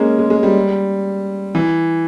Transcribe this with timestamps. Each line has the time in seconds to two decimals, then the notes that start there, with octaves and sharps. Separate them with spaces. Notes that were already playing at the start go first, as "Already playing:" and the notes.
Already playing: G#3 A#3 C#4
0.19 G#3
0.30 G#3
0.43 G3
1.55 E3